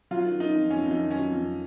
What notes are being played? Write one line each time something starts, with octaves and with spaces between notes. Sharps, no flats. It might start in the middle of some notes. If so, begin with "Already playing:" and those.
F#3 F4
D#3
D#3 D#4
F2
F2 C#4
F2
D#4
D#3
F#3 C#4
F2